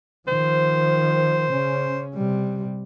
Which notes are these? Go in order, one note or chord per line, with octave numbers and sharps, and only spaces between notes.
D#3 F3 C5
C#3 C#4
C3 G3